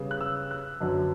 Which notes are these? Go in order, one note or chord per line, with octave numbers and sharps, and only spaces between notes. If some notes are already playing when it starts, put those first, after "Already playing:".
Already playing: C#3 G3 B3
F#6
E6
F#6
F#2 D3 F#3 B3